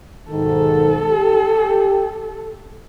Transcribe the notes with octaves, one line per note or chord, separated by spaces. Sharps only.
B1 G#2 D#3 A4
G4